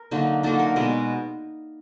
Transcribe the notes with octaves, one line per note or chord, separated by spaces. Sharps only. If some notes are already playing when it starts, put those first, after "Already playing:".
Already playing: A#4
D3 F#3 A#3 D#4
D3 F#3 A#3 D#4 A4
A#4
B2 G#3 B3